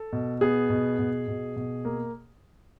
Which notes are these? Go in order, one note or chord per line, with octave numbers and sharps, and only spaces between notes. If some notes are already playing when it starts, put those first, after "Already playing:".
Already playing: A4
B2
B3 G#4
B2
B2
B2
B2
A#3